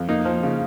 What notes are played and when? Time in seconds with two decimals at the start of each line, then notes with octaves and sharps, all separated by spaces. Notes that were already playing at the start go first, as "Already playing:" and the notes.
Already playing: F2
0.09 A#3 D#4
0.25 F3
0.43 C#3